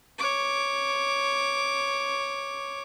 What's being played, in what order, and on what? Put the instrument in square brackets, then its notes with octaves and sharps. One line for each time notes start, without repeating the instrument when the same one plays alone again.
[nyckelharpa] C#5 D6